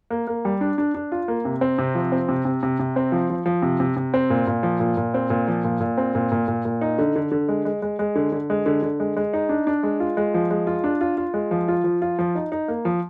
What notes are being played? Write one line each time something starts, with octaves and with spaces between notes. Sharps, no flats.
A#3
A#3
G3
D4
D4
D4
F4
A#3
C3
C4
C3
F3
C4
C3
C3
C3
C3
C4
F3
F3
F3
C3
C3
C3
C4
A#2
A#2
F3
A#2
A#2
C4
A#2
F3
A#2
A#2
C4
A#2
A#2
A#2
A#2
D#4
D3
D3
D3
G#3
G#3
G#3
G#3
D3
D3
G#3
D3
D3
G#3
G#3
D#4
D4
D4
G#3
F4
G#3
F3
G#3
F4
D4
F4
F4
G#3
F3
F4
F3
F4
F3
D#4
D#4
A#3
F3